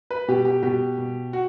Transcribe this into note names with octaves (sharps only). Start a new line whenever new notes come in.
B4
B2 G4
G4
B2 G4
B2
F#4